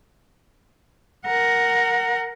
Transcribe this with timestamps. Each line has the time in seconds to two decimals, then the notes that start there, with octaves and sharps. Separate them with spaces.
1.26 A#4 F#5